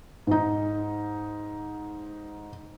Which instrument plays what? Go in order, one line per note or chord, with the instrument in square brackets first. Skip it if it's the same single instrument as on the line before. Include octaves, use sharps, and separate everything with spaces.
[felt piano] G#2 D#4